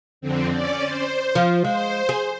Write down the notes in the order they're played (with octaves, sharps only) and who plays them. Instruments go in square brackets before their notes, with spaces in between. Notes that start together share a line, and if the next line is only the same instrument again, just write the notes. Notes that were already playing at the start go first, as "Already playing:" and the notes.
[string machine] F2 D3 C4
C#4 D5
C5
[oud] F3
[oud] G#3 [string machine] C5
[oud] G#4